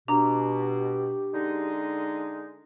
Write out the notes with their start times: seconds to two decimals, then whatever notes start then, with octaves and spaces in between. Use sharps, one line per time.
0.08 B2 D4 G4 A#5
1.34 D3 G#3 D#4